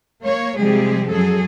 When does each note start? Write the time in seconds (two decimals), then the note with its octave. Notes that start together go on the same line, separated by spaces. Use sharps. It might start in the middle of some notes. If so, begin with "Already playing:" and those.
0.23 A#3 C#5
0.58 C3 F3 G3 G#3 G4 G#4
1.09 F#2 F#3 G#4 A4